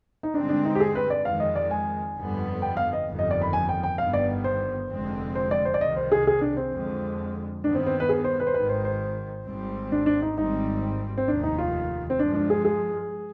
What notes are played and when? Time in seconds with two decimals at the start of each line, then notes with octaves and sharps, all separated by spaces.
0.23 D#4
0.34 G2 D3 G#3 C4 D4
0.49 D4
0.65 D#4
0.75 G4
0.80 G#4
0.95 B4
1.10 D5
1.25 F2 D#3 G#3 F5
1.40 D#5
1.56 D5
1.71 G#5
2.16 G1 F2 D3 G3 B3
2.62 G5
2.77 F5
2.93 D#5
3.08 G1 F2 D#3 G3
3.19 D#5
3.31 D5
3.42 B5
3.53 G#5
3.69 G5
3.83 G5
3.98 G1 G2 D#3 B3 F5
4.13 D5
4.44 C5
4.90 F1 F2 D3 G#3 C4
5.35 C5
5.51 D5
5.65 C5
5.74 D5
5.81 C2 C3 D#3 D#5
5.97 C5
6.12 G#4
6.27 G#4
6.41 D4
6.57 C4
6.73 F2 D3 G#3
7.63 G2 D#3 B3 D4
7.75 C4
7.86 C4
8.00 B4
8.09 G#4
8.24 C5
8.40 B4
8.47 C5
8.54 G#1 G#2 D#3 B4
8.69 C5
8.85 C5
9.45 G#1 G#2 G3 C4
9.92 D4
10.06 D4
10.22 D#4
10.37 G#1 G#2 G3 C4 D#4
11.18 C4
11.28 F1 D#2 D#3 D4
11.43 D#4
11.59 F4
12.10 C4
12.19 G2 F3 G#3 D4
12.34 D4
12.50 G#4
12.65 G#4